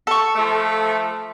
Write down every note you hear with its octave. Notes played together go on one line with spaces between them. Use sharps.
A4 C#6
F3 A3